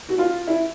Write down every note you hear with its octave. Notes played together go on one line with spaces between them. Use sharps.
F#4
F4
E4